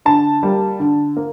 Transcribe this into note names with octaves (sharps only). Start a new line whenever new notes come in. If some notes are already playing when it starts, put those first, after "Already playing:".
D3 A5
G3 A#3
D3
A#3